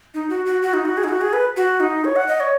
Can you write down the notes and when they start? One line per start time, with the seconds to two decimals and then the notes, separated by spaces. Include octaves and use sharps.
0.14 D#4
0.30 F#4
0.46 F#4
0.62 F#4
0.73 D#4
0.85 F#4
0.97 G#4
1.04 D#4
1.09 F#4
1.21 G#4
1.33 B4
1.57 F#4
1.80 D#4
2.04 C#5
2.16 F#5
2.28 D#5
2.40 C#5